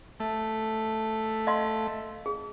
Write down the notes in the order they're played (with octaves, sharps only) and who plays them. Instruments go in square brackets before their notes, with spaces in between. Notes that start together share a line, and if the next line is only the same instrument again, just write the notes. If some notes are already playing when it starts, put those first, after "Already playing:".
[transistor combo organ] A3
[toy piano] D#5 F5 C6
G#4